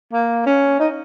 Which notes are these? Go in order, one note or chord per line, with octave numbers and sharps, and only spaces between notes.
A#3
C#4
D#4